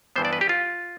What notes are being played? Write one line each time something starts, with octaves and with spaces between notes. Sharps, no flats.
G2 E3 B3 C5
D5
B4
G4
F4